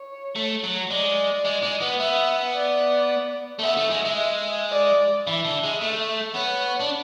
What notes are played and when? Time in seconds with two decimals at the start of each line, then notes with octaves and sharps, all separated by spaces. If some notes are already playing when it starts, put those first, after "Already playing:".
Already playing: C#5
0.36 A3
0.64 F#3
0.90 G#3 D5
1.45 G#3
1.63 G#3
1.82 B3
2.00 B3 E5
2.55 D5
3.59 A3
3.63 B3 E5
3.77 A3
3.90 G#3
4.05 G#3
4.18 E5
4.72 D5
5.26 E3 E5
5.45 D3
5.64 G#3
5.82 A3
6.35 B3 C#5
6.80 D4